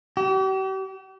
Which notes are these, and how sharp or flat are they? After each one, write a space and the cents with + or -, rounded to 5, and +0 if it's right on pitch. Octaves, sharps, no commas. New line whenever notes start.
G4 -40